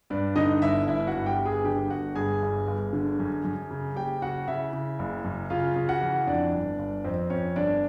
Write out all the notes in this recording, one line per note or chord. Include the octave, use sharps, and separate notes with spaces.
G2 D4 D5
D3 D#4 D#5
G1 E4 E5
G1 E4 E5
F#4 F#5
G2
G4 G5
G1
G#4 G#5
D3 G4 G5
G1 F#4 F#5
G2 G#4 G#5
G1
G1
D3
F#2
F#2
C#3
F#1 G4 G5
C#3 F#4 F#5
C#3 E4 E5
C#3
F#1
F#2
C#3 F4 F5
C#3
F#4 F#5
E3
F2 D4 D5
G1
G1
F2 C4 C5
F2 C#4 C#5
G1 D4 D5